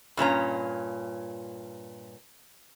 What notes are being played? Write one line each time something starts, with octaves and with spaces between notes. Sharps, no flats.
G2 A#2 C#4 A#5